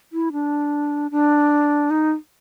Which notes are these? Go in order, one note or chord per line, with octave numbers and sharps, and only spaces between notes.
E4
D4
D4
D#4